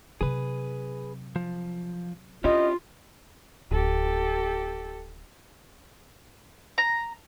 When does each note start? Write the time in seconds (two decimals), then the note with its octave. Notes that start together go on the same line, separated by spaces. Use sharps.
0.21 C3 F#3 G#4 B4
1.36 F3
2.44 C#4 D4 E4 F4 G4 D#5
3.71 D1 G4 A4
6.78 A#5